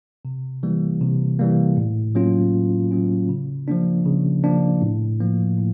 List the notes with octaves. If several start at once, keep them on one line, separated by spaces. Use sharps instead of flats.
C3
E3 G3 A#3
C3
E3 G3 A#3
A2
F#3 A#3 C#4 F4
A2
F#3 A#3 C#4 F4
C#3
F3 A#3 D4
C#3
F3 A#3 D4
A2
F3 A#3
A2